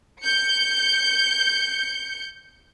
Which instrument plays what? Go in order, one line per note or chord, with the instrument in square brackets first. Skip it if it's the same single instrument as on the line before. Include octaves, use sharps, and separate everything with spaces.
[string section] G6 C#7